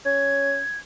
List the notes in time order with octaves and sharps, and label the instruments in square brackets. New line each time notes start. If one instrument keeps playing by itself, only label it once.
[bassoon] C#4 [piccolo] G#6